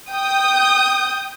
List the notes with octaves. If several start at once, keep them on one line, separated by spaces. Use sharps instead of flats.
G5 D#6 G6